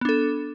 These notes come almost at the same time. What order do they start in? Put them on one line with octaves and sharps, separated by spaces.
B3 D4 A4